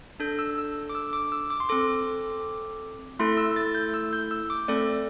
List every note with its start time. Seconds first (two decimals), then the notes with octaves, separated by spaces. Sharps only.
0.20 D4 A4 G6
0.39 E6
0.58 E6
0.89 D6
0.95 E6
1.13 D6
1.32 E6
1.50 D6
1.60 C6
1.69 C4 A4 D6
3.19 A3 E4 A4 C6
3.38 E6
3.56 A6
3.75 G6
3.94 E6
4.13 G6
4.31 E6
4.50 D6
4.68 A3 C4 A4 D5